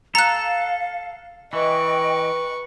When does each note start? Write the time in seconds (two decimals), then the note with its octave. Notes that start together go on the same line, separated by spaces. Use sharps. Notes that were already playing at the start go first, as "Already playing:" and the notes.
0.15 A4 F5 A#5 F#6
1.53 E3 B4 D#5 G5 C#6